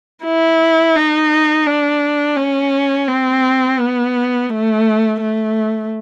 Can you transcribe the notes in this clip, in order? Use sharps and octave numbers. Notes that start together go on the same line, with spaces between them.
E4
D#4
D4
C#4
C4
B3
A3
A3